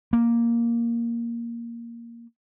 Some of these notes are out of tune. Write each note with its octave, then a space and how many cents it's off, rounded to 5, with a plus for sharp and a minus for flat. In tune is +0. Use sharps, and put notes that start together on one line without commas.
A#3 +5